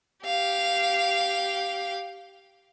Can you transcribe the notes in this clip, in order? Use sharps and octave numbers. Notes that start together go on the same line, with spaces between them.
G4 F5